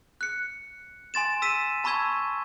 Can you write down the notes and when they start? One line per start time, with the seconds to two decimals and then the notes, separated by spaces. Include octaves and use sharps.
0.21 F#6 C#7
1.14 G#5 C6 A6 E7
1.42 E6 B6 D#7 E7
1.84 A5 B5 C#6 E6 G#6 G7